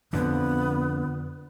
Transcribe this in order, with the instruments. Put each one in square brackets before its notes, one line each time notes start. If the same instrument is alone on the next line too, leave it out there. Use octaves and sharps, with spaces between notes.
[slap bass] F2 D3 [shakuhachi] B3